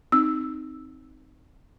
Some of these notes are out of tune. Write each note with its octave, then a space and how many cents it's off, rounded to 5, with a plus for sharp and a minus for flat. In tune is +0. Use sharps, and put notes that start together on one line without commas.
C4 +0 D#4 +0 E6 +0